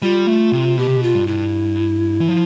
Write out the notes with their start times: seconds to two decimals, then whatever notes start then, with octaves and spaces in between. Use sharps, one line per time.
0.02 G3 F4
0.27 A3
0.52 C3
0.78 B2 G4
0.87 C3
0.97 B2
1.02 F4
1.15 G2
1.27 E4
2.21 E3
2.28 F3